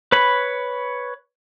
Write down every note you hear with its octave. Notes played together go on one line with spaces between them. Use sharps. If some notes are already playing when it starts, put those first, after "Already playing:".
B4 C#5 B5